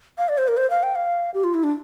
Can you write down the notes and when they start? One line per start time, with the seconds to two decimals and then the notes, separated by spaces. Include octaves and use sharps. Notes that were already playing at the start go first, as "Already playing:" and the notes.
0.18 F5
0.29 D5
0.38 C5
0.48 A#4
0.57 C5
0.70 F5
0.83 G5
0.95 F5
1.34 G4
1.44 F4
1.54 E4
1.64 D4